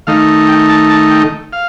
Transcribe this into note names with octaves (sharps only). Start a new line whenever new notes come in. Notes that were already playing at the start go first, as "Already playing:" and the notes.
D#3 A3 D#4 F5
G5
A5
A5
G5
F5